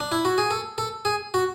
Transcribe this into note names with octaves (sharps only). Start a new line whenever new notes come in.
D4
E4
F#4
G#4
A4
A4
G#4
F#4